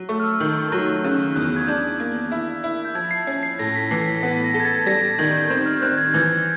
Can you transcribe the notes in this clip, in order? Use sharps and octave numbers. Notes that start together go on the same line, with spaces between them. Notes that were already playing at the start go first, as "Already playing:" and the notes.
Already playing: F#3
A3 C#6
F6
E6
D#3
F#3
C#3 F#6
E2 F#6
G#6
D4 G6
A#3
E4
E4
G6
F3 G#6
C7
C#4 C7
C7
A2 A#6
B6
E3 C7
C7
B6
B3 B6
A#6
A4
G#6
A6
G3 A#6
A6
D#3 G#6
G6
C4 G6
F6
C4 F#6
G#6
E3 G#6